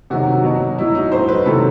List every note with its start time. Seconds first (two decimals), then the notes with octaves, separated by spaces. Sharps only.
0.10 C3 D#3 F#3 F#4
0.43 B2 F#3
0.78 B2 F#3 E4
0.95 D#4
1.12 A2 F#3 C5
1.28 B4
1.45 C3 D#3 F#3 A4